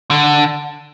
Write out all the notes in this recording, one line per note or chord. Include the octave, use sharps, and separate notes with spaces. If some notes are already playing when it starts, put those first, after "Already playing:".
D3